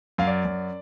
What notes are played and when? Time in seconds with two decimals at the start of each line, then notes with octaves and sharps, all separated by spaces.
0.18 F#2 F5
0.27 D5
0.45 F#2